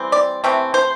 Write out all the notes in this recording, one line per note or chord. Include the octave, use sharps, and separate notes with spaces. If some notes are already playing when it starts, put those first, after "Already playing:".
Already playing: E3 G3 C4
D5
C3 E3 A3 C4
C5